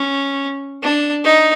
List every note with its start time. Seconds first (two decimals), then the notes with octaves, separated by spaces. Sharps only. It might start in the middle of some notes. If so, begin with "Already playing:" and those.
Already playing: C#4
0.83 D4
1.24 D#4